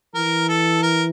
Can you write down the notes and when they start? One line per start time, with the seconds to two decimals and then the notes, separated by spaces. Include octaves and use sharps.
0.15 E3 A#4
0.49 A4
0.83 A#4